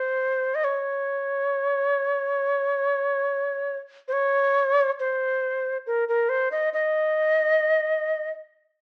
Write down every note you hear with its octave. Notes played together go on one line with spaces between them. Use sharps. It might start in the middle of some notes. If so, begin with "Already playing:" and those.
Already playing: C5
D#5
C#5
C5
C#5
C5
A#4
A#4
C5
D#5
D#5